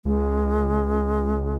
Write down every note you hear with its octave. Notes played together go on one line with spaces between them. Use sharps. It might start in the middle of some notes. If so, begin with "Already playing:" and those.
C#2 G#3